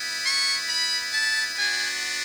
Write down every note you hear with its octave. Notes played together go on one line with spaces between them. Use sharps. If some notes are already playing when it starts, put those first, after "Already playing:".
Already playing: B3 E4
C#6
B5
A5
B3 D4 F#4 G#5